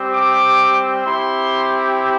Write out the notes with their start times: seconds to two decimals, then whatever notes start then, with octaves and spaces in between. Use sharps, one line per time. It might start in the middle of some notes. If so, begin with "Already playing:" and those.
Already playing: G3 C4 G4
0.11 D6
1.04 C4 E4 G4 C6